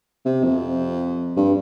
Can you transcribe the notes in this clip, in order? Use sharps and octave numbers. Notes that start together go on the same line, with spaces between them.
C3
F2
G2